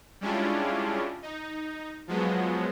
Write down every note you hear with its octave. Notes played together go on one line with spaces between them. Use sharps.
G3 G#3 C#4 D4 E4 F4
D#4
F3 F#3 G#3 B3